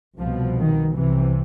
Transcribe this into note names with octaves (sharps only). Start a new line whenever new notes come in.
C2 B2 F3
D#3
C2 C3 E3